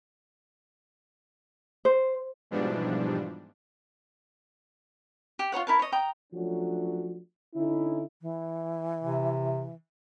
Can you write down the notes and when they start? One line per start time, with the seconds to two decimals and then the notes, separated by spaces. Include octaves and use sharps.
1.85 C5
2.51 G#2 B2 E3 F3 G3 D4
5.39 G4
5.52 F4 A4 C#5 F#5
5.67 E4 A#4 A5
5.79 C#5 D#5
5.92 G5 A#5 D#6
6.33 F3 F#3 A3 C#4 D4 F#4
7.55 D3 C#4 D#4 E4
8.22 E3
9.03 C3